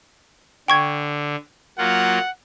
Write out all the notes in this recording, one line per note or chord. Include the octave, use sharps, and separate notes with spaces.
D3 G5 C#6 G#6
F#3 A#3 F4 F#5